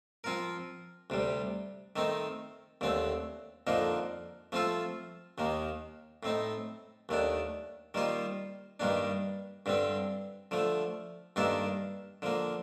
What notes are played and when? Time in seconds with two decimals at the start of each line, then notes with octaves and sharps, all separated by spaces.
0.24 F3 C4 F4 A#4
1.10 D2 C3 G3
1.96 D#3 A3 C4 D#4
2.81 D#2 D3 A3 C4
3.67 F2 D3 F3 A#3 D#4
4.52 F3 A3 C4 F4 A4
5.38 D#2 D#3 A#3
6.23 A2 A3 C4 D#4
7.09 D#2 D#3 A3 D4
7.94 D#3 G3 A#3 F4 C5
8.80 G2 D#3 G3 A#3 D4
9.66 G2 D3 G3 C4
10.51 D3 F3 A3
11.36 G2 D#3 A#3 D4 A4
12.22 D3 F3 A#3